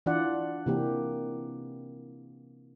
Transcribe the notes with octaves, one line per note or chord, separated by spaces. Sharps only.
E3 D4 F4 D5 F#5
C3 E3 A#3 G4